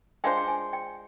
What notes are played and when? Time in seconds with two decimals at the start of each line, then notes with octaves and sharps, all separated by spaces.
0.24 G#3 D4 F4 C5 G5
0.37 G5
0.48 G#5
0.73 G5